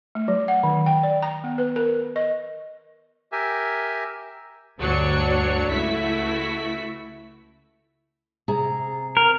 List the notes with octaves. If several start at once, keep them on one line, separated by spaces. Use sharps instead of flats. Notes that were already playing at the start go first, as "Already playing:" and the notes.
A3
F#3
F#5
D#3
G5
D5
A#5
B3
B4
A#4
D#5
G4 A#4 E5 G#5
D2 G2 F#3 D4 C#5 C#7
C#2 A3 E4 F#4 E5 B6
C3 G#4 A#5
A#4